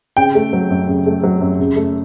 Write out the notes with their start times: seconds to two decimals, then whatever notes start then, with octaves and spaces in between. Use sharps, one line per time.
0.17 C#3 G5
0.35 A3
0.53 F#3
0.70 F#2
0.87 C#3
1.06 A3
1.23 F#3
1.41 F#2
1.60 C#3
1.76 A3